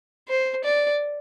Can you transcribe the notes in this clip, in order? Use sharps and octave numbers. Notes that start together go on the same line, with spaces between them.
C5
D5